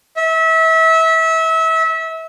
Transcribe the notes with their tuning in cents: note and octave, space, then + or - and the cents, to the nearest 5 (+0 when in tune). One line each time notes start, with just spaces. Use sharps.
E5 -30